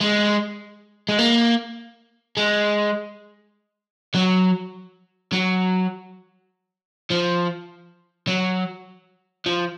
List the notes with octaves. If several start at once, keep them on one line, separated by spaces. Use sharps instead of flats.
G#3
G#3
A#3
G#3
F#3
F#3
F3
F#3
F3